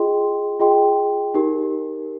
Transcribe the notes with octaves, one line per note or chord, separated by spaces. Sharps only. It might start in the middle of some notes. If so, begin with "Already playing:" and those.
Already playing: F4 G#4 D#5 G5 C6
F4 G#4 D#5 G5 C6
D#4 G4 A#4